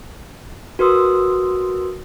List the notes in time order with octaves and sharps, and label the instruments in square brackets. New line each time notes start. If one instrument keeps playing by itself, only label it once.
[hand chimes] F#4 A#4 B4 C6 D#6 E6